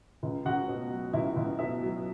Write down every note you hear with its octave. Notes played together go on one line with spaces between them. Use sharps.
C#2
C#2 F#4 F#5
B2
F#3
C#2 E4 E5
C#2
B2 E4 E5
F#3